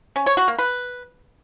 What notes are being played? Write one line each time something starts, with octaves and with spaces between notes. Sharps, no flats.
C#4
C#5
F#4
A#3
B4